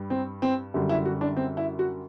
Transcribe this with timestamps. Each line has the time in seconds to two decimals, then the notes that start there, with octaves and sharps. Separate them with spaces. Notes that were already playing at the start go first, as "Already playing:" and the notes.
Already playing: G2 G3
0.10 C4
0.42 C4
0.74 F#2 D3 G3
0.89 E4
1.05 F#4
1.21 D4
1.37 C4
1.57 E4
1.79 F#4